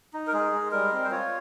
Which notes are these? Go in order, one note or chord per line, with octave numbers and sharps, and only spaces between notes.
D#4
A#4
G#3 G#4
G#3
G3 A#4
C4
C5
F4 C#5